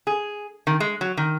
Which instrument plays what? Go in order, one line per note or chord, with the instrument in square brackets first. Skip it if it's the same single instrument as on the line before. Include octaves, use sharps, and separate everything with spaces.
[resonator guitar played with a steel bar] G#4
D#3
G#3
F#3
D#3